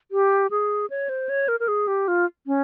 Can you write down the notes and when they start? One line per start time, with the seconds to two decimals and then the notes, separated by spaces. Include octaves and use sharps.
0.11 G4
0.51 G#4
0.90 C#5
1.09 C5
1.29 C#5
1.48 A#4
1.60 A#4
1.68 G#4
1.87 G4
2.08 F4
2.47 C#4